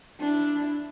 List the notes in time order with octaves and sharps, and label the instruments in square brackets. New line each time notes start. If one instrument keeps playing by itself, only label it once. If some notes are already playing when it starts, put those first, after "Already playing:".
[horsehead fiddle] D4 E4